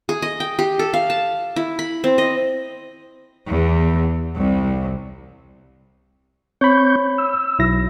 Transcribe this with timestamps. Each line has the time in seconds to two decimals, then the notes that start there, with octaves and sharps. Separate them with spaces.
0.09 G#4
0.22 D#5
0.40 G5
0.59 G4
0.79 A4
0.94 F5
1.10 A5
1.56 E4
1.79 B5
2.04 C4
2.18 D#5
3.48 E2
4.36 C2
6.61 C4 C#5 B5 C#6 G6
7.18 E6
7.59 B1 E4 A#6